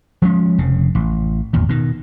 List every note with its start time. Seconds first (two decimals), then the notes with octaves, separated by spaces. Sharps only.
0.22 F3 G#3 C#4
0.58 F1 C#3
0.95 A1
1.53 G#1 E2 A#2
1.69 B2 D#3